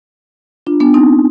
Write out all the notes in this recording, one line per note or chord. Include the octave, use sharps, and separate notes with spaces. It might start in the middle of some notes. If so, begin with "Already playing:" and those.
D4 F4
B3 D4
C4 D#4